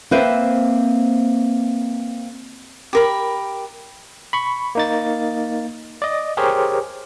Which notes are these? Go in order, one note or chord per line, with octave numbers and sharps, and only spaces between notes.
A#3 C4 B4 C5 E5
G4 A#4 B5
B5 C#6
A#3 D#4 A6
D5 D#5
G4 G#4 A#4 C5 C#5